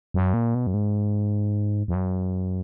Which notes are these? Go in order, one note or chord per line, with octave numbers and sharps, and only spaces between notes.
F#2
A#2
B2
F#2
G#2
F2
F#2